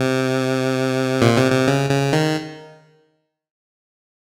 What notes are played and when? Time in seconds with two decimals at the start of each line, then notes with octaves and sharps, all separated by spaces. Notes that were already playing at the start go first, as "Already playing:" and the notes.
Already playing: C3
1.22 A#2
1.38 C3
1.52 C3
1.67 C#3
1.90 C#3
2.13 D#3